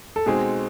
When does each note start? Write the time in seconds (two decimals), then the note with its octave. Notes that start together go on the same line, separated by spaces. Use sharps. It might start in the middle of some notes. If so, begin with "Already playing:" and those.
0.16 A4
0.26 B2 G#3 C4 D#4 G#4